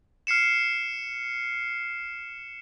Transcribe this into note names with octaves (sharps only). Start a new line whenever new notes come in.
F6 C7 C#7 E7